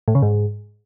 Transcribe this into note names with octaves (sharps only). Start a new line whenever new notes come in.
A2
C#3
G#2